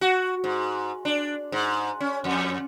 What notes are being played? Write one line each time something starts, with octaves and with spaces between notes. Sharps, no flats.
F#4
G#2
D4
G#2
C#4
F2